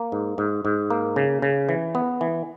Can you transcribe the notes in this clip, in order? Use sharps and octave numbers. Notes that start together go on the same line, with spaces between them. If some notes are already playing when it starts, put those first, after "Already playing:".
Already playing: A#3
G#2
G#2
G#2
A#3
C#3
C#3
E3
B3
E3